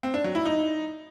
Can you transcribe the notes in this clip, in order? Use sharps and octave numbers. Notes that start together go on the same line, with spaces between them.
C4
D4
F#3
E4
D#4